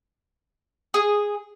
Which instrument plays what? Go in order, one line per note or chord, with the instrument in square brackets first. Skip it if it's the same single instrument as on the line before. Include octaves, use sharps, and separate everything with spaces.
[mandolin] G#4